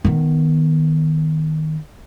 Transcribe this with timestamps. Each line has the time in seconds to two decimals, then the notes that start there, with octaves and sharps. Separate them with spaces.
0.04 D#3 B3